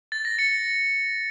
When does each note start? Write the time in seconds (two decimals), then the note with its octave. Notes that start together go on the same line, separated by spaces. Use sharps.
0.12 A6
0.25 A#6
0.39 A6 C#7